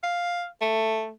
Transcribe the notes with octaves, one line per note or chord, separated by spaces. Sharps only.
F5
A3